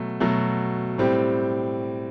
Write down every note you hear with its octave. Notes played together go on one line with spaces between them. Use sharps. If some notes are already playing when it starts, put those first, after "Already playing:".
Already playing: B2 F#3 A3
B2 F#3 A3
A2 G3 C4 G4